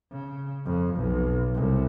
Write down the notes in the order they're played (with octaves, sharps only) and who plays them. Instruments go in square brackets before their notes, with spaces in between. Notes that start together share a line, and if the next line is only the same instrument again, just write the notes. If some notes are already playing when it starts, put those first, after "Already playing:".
[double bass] C#3
F2
B1
C2